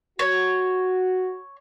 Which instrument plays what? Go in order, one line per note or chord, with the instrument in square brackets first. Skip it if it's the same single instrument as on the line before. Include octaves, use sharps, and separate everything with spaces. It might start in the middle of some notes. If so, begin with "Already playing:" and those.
[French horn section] F#4 [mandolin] C#5